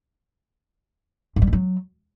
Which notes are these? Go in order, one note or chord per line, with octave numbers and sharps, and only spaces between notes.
G#2
G3
G#2
F#3